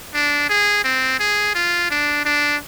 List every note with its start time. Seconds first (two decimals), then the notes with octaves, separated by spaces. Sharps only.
0.15 D4
0.49 G#4
0.84 C4
1.20 G#4
1.55 F4
1.91 D4
2.25 D4